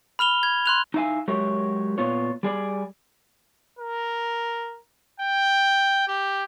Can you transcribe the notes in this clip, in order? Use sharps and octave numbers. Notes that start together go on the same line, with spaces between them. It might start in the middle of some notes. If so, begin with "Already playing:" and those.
B5 F6 F7 G7
G#6
C6 F#6 F7
D#4 E4 E5 F5 G#5
F#3 G#3 G4 A#4 C#5 E5
A#2 B3 F4 C#5
G3 G#4 D5
A#4
G5
G4